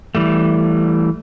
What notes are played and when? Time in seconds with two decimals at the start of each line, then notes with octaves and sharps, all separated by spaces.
0.15 E3 G3 A3